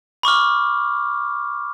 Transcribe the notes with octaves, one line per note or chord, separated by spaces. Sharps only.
B5 C#6 D6 F6